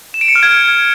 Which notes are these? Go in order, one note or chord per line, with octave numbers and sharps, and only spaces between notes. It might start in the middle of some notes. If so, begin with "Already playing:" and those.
E7
D7
C#7
F6
G#6